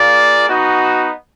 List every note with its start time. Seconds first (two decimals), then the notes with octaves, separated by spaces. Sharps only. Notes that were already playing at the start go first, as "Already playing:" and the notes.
Already playing: A#3 F4 G#4 D5
0.49 B3 D#4 F#4